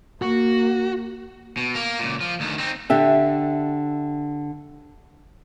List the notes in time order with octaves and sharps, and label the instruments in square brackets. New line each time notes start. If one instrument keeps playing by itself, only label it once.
[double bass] A#3 [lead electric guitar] F#4
[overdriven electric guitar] B2
A#3 A#4
C#2 A#2
F3
D2 D#3
C4 D#4
[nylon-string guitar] D3 D4 G4 E5